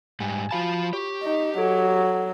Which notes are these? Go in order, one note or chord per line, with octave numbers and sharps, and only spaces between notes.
G#2 G3 G#5
F3 F4 F#4 F5 A5 B5
G4 C#5 C#6
D#4
F#3 A4 G#6 D7